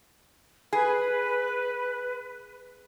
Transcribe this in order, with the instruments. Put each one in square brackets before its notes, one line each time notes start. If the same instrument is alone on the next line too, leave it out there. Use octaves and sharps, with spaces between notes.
[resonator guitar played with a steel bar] G#4 [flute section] B4